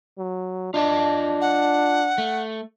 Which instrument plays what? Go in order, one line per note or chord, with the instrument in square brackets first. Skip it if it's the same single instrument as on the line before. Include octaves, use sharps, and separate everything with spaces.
[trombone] F#3
[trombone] D4 [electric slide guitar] F4 D#5 A5
[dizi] F#5
[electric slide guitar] A3